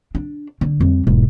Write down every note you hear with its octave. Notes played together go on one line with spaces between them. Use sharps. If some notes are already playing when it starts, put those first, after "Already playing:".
D4
D3
F2 G3
E1 G#2